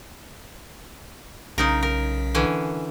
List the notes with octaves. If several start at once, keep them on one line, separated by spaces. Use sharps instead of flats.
B1 C#3 D#4 A#4
A#4
D3 E3 C#4